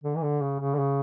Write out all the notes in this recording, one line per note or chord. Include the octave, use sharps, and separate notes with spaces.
D3
E3
D3
C#3
C#3
D3
C#3